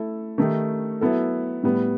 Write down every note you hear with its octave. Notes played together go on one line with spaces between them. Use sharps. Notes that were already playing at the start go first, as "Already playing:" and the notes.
Already playing: A3 E4 A4
D#3 A3 D#4 G4
F#3 B3 E4 A4
A2 G3 B3